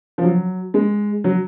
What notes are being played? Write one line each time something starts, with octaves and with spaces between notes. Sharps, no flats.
F3
F#3
G#3
F#3